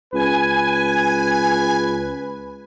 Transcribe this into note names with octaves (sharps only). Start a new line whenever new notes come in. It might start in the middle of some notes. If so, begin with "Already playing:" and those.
C#2 B4 G#5